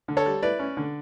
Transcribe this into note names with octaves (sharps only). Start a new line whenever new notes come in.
D3
A4 C#5
G3
E4 B4 D5
C#4
D3